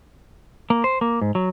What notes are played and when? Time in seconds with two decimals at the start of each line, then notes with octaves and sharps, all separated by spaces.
0.70 A#3
0.84 C5
1.01 A#3
1.21 G#2
1.35 F#3